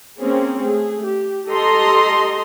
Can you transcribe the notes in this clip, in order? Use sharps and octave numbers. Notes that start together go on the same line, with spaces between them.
A#3 C4 C#4 G#4
A3 G#4
G4
G4 A4 D#5 A#5 C6